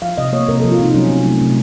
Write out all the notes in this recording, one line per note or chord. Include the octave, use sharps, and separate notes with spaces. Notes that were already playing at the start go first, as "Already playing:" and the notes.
F3 F5
C3 D#5
A#3 C#5
C3 A#4
F3 A4
F4
C3 D#4
F#3 C#4
C3
A3
C3